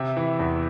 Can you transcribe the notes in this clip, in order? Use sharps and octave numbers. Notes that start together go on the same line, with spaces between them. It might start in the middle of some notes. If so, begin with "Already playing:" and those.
Already playing: C3 E5
E3
E2